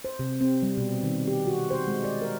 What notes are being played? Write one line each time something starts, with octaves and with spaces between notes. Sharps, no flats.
C5
C3
C4
G3
B2
D#3
G4
F#4
C5
G#3
D5
A#4